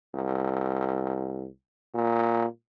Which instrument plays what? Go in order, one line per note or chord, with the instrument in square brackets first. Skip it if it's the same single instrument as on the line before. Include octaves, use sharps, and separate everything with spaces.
[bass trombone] C2
A#2